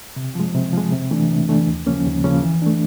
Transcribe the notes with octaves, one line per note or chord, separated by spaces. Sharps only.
C3
F3 G#3
C3
F3 G#3
C3
E3 A3 D4
C3
E3 A3 D4
D#2
C#3 F3 A#3 C#4
D#2
C#3 F3 A#3 C#4
E3
A3 D4